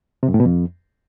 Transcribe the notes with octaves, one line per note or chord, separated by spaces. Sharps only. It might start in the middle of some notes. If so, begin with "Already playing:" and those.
C3
F#2
A2
B2
F2